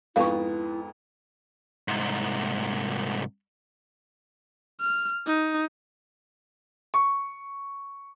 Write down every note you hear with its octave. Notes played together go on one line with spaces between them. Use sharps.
F2 G#2 B3 E4 F5 C#6
C2 G#2
F6
D#4
C#6